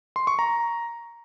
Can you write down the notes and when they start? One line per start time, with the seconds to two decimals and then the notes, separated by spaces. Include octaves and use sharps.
0.16 C6
0.27 C#6
0.39 A#5